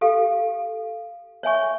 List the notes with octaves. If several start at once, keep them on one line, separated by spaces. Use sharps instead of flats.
G4 A4 F5
C#5 E5 G#5 C#6